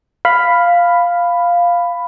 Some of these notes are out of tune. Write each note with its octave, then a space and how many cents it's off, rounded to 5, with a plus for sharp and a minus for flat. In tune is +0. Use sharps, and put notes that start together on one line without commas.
F5 +0 B5 +5